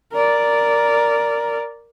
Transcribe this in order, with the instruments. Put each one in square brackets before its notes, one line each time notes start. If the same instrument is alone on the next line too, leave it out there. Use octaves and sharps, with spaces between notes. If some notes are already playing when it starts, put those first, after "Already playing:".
[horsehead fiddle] A#4 D5